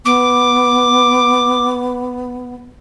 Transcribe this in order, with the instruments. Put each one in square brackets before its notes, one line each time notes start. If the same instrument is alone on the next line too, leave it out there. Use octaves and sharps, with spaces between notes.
[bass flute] B3 [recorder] D6